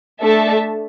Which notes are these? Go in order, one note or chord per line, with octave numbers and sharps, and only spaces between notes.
A3 D4 A4 E5 A5